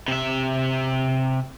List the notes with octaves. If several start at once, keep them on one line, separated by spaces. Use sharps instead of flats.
C3 E5